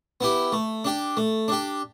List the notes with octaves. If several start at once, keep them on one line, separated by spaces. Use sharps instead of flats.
B3 E4 G4
A3
D4 G4
A3
D4 G4